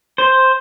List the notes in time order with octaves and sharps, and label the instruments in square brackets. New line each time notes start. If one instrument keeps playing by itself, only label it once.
[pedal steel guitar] C5